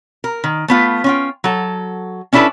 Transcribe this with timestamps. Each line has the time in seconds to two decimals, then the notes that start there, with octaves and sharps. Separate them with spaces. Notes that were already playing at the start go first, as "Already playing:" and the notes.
0.24 A#4
0.44 D#3
0.68 A3 B3 F4
1.04 C#4 F4 G5
1.44 F#3 A4
2.33 C#4 D4 E4 G4 A4 B4